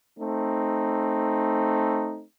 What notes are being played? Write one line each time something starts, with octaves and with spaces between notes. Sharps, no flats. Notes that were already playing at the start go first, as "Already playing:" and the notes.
A3 C4 D#4